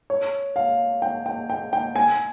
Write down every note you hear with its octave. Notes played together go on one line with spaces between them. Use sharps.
C#5
F5
G5
G5
G5
G5
G#5